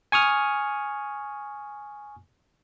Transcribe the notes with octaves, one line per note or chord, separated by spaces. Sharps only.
G#5 C#6 D#6 F6